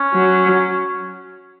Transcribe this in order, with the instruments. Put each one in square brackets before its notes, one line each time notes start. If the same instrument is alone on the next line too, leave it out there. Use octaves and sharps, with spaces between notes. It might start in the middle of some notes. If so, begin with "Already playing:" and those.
Already playing: [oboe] C#4
[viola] F#3